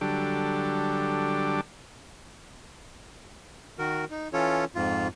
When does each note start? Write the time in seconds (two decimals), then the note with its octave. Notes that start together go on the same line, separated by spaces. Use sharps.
0.01 D3 F#3 G3 D4 G4 A4
3.79 D#3 F#4 A#4
4.11 D#4
4.33 E3 C#4 F4 A4 C#5
4.75 F2 G#2 F4